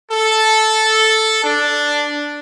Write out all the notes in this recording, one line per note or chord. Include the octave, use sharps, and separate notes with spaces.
A4
D4